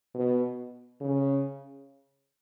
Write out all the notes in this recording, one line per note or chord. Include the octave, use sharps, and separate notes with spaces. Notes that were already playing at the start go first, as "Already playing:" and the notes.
B2
C#3